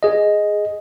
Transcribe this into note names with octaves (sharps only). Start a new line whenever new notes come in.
G#4 D#5